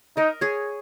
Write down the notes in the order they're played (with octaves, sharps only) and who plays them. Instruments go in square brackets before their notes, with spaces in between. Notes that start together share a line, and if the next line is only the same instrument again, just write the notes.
[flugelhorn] D#4 [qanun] A#4 D#5
[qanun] G#4 C#5